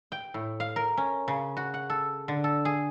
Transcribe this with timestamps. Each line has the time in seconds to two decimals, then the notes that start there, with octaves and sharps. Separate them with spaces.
0.12 G5
0.34 A2
0.60 F5
0.76 A#4
0.97 C#4
1.28 C#3
1.57 F#4
1.74 F#5
1.90 A4
2.28 D3
2.44 A4
2.65 G#4